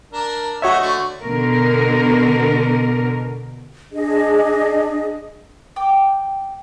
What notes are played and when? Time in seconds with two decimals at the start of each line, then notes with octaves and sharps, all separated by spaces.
0.12 D4 A#4
0.62 A3 F#4 C#5 D#5 E5
0.80 D3 A3 C#6
1.22 B2 D3 A#4
3.92 D4 G#4 D#5
5.76 G5 D6